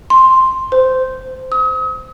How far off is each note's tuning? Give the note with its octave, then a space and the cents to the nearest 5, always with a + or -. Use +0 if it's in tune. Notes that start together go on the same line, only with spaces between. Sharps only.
C6 +5
C5 -15
D#6 +40